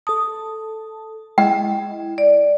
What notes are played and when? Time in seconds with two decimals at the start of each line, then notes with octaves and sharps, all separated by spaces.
0.07 A4 A5 D#6
1.38 G#3 E4 D#5 G5
2.18 D5